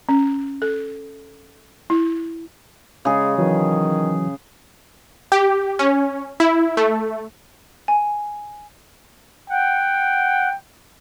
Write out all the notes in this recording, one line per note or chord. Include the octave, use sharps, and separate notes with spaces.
C#4
A4
E4
C#3 G#3 G#4
D#3 E3 F#3
G4
C#4
E4
A3
G#5
F#5 G5